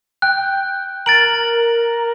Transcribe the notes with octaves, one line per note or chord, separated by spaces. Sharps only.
G5 F#6
A#4 A6 D7 F#7